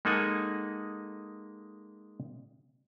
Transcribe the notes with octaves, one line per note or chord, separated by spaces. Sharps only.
G#3 A#3 D#4 A4 F#5 G#5